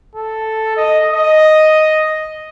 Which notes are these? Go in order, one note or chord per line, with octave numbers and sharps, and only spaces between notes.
A4
D#5
D#5